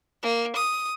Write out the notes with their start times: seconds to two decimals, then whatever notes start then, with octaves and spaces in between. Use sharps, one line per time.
0.23 A#3
0.56 D#6